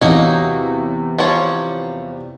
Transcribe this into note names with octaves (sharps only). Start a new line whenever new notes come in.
E2 C3 F#3 A#3 D#4
F3 G3 C#5